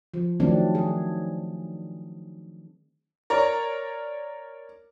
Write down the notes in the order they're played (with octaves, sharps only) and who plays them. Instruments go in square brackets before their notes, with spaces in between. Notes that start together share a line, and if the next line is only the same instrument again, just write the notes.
[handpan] F3
D#3 F3 F#3 A3 C4 D4
G#4
[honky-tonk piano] A#4 C#5 D5